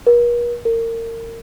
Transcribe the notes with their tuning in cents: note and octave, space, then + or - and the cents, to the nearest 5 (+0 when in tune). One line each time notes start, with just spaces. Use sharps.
A#4 +45
A#4 -30